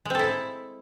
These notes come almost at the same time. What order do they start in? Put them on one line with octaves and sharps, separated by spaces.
G#3 C4 A4 E4